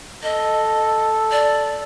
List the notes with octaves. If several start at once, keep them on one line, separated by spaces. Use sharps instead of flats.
A4 D#5
D5